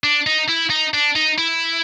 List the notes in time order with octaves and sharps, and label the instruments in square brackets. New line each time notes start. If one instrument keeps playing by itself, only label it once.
[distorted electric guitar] D4
D#4
E4
D#4
D4
D#4
E4